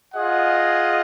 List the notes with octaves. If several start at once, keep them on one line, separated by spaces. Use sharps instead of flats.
F4 G#4 D#5 F#5